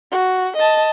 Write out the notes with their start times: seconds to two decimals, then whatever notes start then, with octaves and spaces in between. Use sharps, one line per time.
0.12 F#4
0.57 D#5 A5